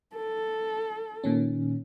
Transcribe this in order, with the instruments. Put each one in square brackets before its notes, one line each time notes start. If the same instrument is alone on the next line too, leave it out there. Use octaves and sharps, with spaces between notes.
[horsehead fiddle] A4
[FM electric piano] A#2 D#3 C#4